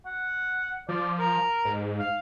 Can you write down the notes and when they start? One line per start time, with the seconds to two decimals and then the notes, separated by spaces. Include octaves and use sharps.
0.06 F#5
0.89 F3 D5
1.19 A#4
1.65 G#2
1.99 F5